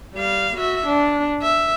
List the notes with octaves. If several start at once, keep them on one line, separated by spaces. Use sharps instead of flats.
G3 F5
F#4 E5
D4
E5